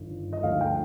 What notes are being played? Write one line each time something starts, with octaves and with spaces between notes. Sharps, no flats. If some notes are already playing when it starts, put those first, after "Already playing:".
Already playing: G1 G2 D#3
D#5
D2 D3 F3 F5
G5